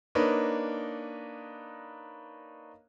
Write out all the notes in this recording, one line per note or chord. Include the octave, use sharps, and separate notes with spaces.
A#3 D4 D#4 A#4 B4 C#5